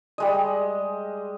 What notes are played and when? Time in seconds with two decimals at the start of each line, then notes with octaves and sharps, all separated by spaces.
0.18 G3 G#3 D#5